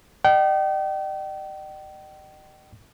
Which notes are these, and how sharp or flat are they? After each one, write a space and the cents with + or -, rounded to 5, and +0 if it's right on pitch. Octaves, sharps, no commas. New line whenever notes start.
D#5 -40 G5 -35